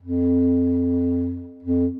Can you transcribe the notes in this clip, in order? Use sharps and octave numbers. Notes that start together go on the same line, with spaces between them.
F2
F2